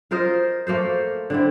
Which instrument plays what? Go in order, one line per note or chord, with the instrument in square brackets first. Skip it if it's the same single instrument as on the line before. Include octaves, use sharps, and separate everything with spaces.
[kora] F4 A#4 C5 D#5
A3 A#3 A4 C5
D3 C4 E4